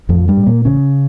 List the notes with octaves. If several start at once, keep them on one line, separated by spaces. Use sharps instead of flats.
A1 F2 F3
G2 G3
A2
A#2 A#3
A1 C#3 C#4